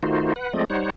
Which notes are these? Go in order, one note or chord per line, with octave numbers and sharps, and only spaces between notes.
D#3 A3 D#4 F4 F#4 C5
B4 F#5
F3 G#3 A3 C4 D5 D#5
G3 D#4 C5 C#5 F#5